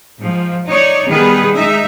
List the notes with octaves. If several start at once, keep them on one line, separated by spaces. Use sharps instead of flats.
G#2 F3
D#4 C#5 D5
D#3 G3 B3 G#4 B4
G#3 D#4 E5